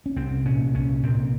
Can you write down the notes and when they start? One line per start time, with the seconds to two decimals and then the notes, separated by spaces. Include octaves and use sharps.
0.06 C#4
0.16 C2 C4
0.46 A#2 C#4
0.75 C2 C#4
1.03 A#2 C4